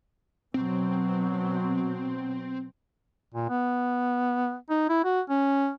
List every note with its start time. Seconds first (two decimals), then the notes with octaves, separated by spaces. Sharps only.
0.54 B2 F#3 C4
3.34 A#2
3.49 B3
4.70 D#4
4.89 E4
5.04 F#4
5.29 C#4